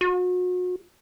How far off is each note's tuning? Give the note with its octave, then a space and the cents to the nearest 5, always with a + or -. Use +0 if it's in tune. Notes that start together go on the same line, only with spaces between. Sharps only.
F#4 -35